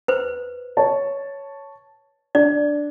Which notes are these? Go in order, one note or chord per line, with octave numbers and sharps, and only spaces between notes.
B4 C5
C#5 A5
D4 D5